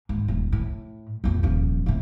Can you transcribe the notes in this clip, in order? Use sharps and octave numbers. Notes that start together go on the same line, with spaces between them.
G#2
D#1
A2
A#1 F2
D#1 F3
A2 C3